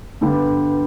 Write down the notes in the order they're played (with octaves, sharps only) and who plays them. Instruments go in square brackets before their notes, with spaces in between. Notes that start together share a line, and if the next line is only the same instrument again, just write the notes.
[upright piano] G2 D3 G3 B3